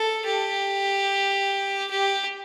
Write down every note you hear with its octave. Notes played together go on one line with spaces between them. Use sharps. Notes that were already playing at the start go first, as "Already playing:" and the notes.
Already playing: A4
G4
G4